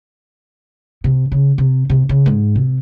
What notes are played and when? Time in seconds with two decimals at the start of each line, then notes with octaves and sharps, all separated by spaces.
1.04 C3
1.32 C#3
1.58 C3
1.90 C3
2.09 C#3
2.26 G#2
2.56 C3